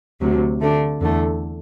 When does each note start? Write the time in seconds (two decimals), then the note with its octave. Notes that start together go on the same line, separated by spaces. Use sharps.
0.21 D2 C3 F#3
0.60 D3 A3 D4
1.00 E2 D3 A3